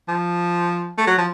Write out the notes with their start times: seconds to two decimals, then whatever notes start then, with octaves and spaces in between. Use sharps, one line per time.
0.09 F3
0.98 A3
1.07 F#3
1.18 F3